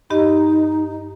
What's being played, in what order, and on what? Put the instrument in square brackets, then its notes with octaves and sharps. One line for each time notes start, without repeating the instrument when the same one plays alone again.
[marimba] G2 G4 D#5 [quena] D#4